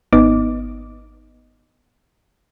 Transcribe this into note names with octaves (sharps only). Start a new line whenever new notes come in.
G#1 B3 D#4 D#5 D6